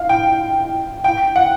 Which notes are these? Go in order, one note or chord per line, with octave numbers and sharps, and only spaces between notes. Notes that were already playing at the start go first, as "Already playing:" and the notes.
Already playing: F5
G5
G5
F#5